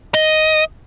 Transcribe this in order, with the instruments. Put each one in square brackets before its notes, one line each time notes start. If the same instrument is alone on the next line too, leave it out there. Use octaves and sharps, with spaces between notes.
[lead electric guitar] D#5